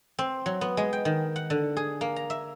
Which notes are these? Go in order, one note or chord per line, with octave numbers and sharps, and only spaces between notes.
C4
F#3
B3
G#3
G5
D#3
F#5
D3
G#4
A#3
A#5
E5